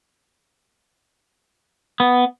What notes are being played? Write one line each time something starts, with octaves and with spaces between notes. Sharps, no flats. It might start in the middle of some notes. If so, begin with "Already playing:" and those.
B3